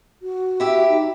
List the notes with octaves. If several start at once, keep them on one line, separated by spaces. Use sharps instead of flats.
F#4
E4 G4 E5
D#4